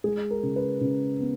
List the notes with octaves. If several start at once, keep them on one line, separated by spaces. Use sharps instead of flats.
G#3 G#4
A#4
C#3
B4
C#3
B3